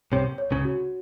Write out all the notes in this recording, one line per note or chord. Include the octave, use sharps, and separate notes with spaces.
C2 C3 C#5
C#5
C#2 C#3
F#4